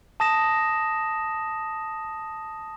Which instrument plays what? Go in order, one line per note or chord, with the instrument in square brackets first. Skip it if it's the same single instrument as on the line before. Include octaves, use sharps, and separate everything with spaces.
[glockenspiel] A5 D#6 A#6 E7